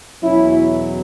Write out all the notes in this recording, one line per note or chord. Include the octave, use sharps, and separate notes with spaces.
E2 B2 F#3 C#4 E4